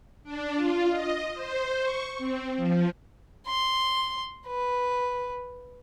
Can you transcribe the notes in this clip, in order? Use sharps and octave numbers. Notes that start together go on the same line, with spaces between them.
D4
F4
D#5
C5
C#6
C4
F3
C6
B4